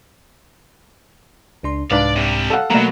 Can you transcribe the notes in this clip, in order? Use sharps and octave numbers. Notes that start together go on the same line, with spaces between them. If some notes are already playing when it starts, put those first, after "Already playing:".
C#2 D4 C6
C2 G#2 D4 B4 D5 F5
C3 G3
A4 F5 F#5
B2 F#3 A3 A#3 A#5